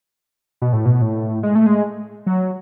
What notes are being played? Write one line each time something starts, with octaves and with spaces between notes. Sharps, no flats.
B2
A2
B2
A2
G#3
A3
G#3
F#3